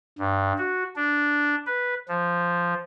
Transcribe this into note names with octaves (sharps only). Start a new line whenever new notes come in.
G2
F#4
D4
B4
F3